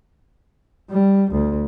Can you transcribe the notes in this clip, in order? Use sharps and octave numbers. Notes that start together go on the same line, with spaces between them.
G3
D2